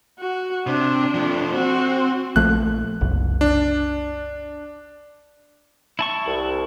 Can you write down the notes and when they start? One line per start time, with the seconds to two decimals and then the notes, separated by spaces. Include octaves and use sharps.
0.19 F#4
0.67 C3 D4
1.14 F3 A3
1.54 C4 F#4
2.36 A#1 F3 A3 F#6
3.01 F#1 C2
3.41 D4
5.99 E4 A5 C#6
6.26 C2